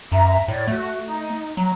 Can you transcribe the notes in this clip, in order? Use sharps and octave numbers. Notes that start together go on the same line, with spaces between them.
F#2 E5 A#5
A2 C#5 D5
A3 F#4
D#4
F#3 A#5